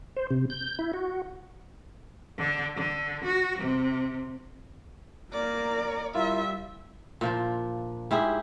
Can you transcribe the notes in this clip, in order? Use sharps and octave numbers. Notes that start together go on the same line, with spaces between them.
C5
C3
G6
E4
F#4
D3
D3
F#4
C3
A#3 A#4 D5
G3 E4 F4 A#4 E5
A#2 F3 D4
G#2 E4 G4 G#4